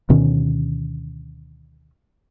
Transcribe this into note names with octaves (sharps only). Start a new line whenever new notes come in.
D2 B2 D#3 C#4